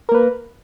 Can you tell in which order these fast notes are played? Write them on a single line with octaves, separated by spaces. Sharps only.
A#4 A#3 B4